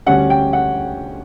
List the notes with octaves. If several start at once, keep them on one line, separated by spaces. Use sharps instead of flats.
D2 D3 G3 C#4 F#5
G5
F#5